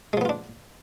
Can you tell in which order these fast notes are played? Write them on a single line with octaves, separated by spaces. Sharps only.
G#3 F3 B3 F4 D4